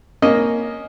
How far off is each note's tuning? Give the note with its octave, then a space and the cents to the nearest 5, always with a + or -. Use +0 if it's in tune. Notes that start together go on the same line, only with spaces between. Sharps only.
A#3 +0 C#4 +10 D#5 -5